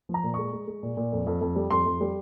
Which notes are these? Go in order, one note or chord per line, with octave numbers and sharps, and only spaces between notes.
F3
A#5
A#2
G#3 C#6
G#3
G#3
A#2
A#2
F2
F2
F2
G3
F2 C6
F2
G3